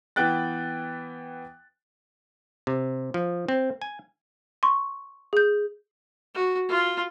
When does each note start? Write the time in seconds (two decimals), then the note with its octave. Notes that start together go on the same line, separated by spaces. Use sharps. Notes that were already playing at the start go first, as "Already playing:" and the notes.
0.16 E3 B3 G5 F#6 A6
2.67 C3
3.14 F3
3.48 C4
3.82 G#5
4.63 C6 C#6
5.33 G#4 G6
6.35 F#4
6.69 F4